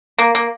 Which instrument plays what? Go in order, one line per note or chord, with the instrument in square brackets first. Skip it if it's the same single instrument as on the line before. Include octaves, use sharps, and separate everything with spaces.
[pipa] A#3
A#3